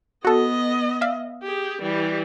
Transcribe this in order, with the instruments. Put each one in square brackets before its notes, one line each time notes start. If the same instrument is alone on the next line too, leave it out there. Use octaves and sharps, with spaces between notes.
[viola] B3 D#5 [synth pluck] F#4 A4
[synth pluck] E5 F5
[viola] G4 G#4
E3 G3